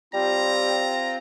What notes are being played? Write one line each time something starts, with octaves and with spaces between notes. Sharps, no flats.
G3 C4 F4 A#5